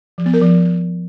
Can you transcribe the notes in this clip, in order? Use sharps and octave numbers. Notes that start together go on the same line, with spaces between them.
F3
B3
A#4
F3